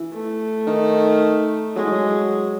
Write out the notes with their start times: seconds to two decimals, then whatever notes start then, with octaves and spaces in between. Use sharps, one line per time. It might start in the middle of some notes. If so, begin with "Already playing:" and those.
Already playing: E3
0.13 A3
0.67 D#3
1.76 F#3 G#3
1.84 E3
1.91 F#3